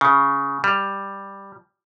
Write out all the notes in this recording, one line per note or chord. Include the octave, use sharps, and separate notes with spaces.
C#3
G3